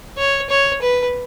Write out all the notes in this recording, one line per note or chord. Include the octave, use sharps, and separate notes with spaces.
C#5
C#5
B4